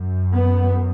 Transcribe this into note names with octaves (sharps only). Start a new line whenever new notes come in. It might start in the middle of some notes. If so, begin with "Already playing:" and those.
Already playing: F#2
B3